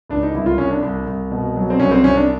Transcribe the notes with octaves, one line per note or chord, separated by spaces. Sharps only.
C#2 D4
D#4
C2 E4
F4
C2 C#4
D4
C2
C2
B2
F#3
C4
C2 C#4
C4
C2 C#4
D4